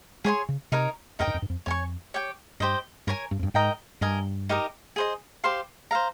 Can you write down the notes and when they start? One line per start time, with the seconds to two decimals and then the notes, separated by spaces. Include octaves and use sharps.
0.24 G#3 G#4 C#5 G#5 C6
0.49 C#3
0.72 C3 D#4 A#4 C#5
1.19 F2 D#4 A#4 D#5 G5
1.27 G2
1.34 F2
1.42 G2
1.50 F2
1.66 F2 C#5 G#5 C#6
2.14 G4 C#5 G5
2.60 G2 G4 C5 D#5
3.07 G2 A#4 C#5 G#5
3.31 G2
3.39 F2
3.43 G2
3.54 G#2 A#4 D#5 G5 A#5
4.01 G2 A#4 D#5 G#5
4.49 D#4 G4 A#4 D#5
4.96 G#4 C5 D#5
5.44 G4 C5 F5 C6
5.91 C5 F5 A#5